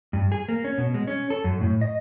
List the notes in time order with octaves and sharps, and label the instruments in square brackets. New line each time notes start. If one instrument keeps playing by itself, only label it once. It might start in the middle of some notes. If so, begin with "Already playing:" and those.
[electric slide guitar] G2
G#4
A#3
C#4
B2
G#3
C#4
A4
F#2
A2
D#5